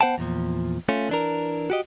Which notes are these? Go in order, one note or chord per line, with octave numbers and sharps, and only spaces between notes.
B3 C5 F#5 G5 A5
E2 A#2 F3
A3 C#4 F4
E3 D4 A#4
F#4 G4 D#5